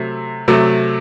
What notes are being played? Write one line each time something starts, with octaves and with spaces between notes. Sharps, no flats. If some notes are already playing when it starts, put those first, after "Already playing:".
Already playing: C3 F#3 A3
C3 F#3 A3